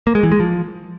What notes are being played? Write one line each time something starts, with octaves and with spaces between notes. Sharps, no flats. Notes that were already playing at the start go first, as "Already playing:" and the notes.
A#3
G#3
E3
G#3
F3